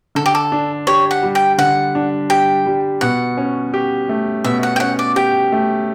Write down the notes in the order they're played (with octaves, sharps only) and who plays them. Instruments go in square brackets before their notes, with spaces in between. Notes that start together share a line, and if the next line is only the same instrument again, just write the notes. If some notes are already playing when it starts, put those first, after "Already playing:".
[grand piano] D3 [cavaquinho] A4
[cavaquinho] G4
A4
[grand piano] D4
[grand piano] G4 [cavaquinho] C#5
[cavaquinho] F#5
[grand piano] G3
[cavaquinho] G5
[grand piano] D3 [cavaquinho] F#5
[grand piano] D4
[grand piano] G4 [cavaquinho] G5
[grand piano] G3
[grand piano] B2 [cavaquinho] F#5
[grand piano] C#4
G4
A3
[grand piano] B2 [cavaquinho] E5
[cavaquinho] F#5
G5
[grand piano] C#4 [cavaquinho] F#5
[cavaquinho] D5
[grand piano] G4 [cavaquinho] G5
[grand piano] A3